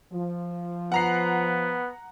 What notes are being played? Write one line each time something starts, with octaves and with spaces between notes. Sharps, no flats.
F3
B3 F#5 A#5 C7